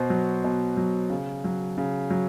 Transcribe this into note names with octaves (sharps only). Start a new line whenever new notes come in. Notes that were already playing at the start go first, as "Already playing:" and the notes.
Already playing: B2 C5
F#3
B2
F#3
C#3
F#3
C#3
F#3